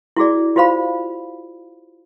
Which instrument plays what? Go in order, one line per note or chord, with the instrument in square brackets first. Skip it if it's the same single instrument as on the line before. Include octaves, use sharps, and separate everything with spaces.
[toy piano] E4 F#4 G#4 D5
F4 F#4 C5 F5 B5